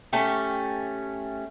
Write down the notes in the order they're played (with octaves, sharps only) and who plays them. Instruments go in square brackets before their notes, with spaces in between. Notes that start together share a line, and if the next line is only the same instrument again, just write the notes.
[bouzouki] A3 C#4 G4